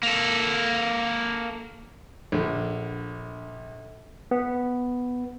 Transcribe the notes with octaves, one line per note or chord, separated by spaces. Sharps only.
A#3 A4
A#1 D3
B3